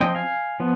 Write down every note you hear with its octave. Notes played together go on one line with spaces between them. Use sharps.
F3 C4 D#5 G5
F5 G#5
F3 B3